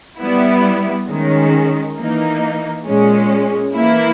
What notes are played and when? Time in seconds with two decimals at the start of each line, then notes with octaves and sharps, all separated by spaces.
0.19 G3 B3 E4
1.08 D#3 G#3 C#4
1.98 E3 A#3 D#4
2.86 A#2 G#3 C#4
3.75 E3 A#3 E4